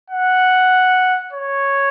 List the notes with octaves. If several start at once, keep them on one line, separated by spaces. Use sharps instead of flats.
F#5
C#5